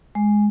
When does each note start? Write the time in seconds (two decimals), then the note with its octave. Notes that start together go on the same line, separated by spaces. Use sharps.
0.15 G#3